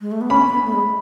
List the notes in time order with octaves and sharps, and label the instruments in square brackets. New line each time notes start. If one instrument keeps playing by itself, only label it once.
[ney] G#3
A3
B3
[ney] C#4 [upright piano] B5
[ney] C#4
B3
A3
G#3